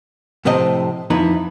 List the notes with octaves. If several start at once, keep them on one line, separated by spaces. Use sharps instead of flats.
A2 C3 F3 C4 D#5
F2 D#4 E4 B4